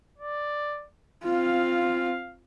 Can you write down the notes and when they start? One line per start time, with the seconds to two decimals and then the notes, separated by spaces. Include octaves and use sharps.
0.18 D5
1.24 C4 F4 F5